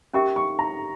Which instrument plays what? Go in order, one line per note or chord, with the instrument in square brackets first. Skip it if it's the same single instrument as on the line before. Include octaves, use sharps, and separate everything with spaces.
[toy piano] C#4 G4 A#4 E5 [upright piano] C#6
[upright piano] C#6
A#5